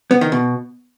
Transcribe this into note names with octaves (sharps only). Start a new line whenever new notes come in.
B3
D#3
B2